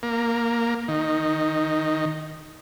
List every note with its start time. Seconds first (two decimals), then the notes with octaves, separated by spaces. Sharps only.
0.03 A#3
0.88 D#3